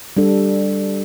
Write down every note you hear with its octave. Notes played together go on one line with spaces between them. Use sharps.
G3 D4 A4